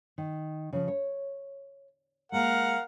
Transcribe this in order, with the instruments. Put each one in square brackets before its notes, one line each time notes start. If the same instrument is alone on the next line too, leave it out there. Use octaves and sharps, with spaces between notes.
[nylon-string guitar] D#3
C#3 F3
C#5
[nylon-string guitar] G#3 A#3 [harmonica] A#4 F5 F#5